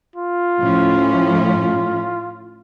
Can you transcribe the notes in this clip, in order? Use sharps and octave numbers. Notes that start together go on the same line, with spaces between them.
F4
A2 F3 C#4